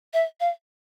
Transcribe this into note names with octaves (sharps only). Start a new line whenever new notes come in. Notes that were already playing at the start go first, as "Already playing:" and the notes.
E5
F5